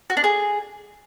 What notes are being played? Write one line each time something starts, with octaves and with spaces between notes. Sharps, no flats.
F#4
D4
G#4